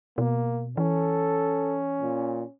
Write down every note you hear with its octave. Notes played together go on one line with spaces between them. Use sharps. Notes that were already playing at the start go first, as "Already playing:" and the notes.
B2 A#3
E3 C#4 A4
A#2